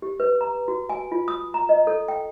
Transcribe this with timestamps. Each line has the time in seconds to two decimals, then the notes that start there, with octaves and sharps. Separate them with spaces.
0.02 G4
0.20 B4
0.41 A#5
0.68 F#4
0.90 G#5
1.12 F4
1.28 D#6
1.54 A#5
1.69 D#5
1.87 A4
2.08 G5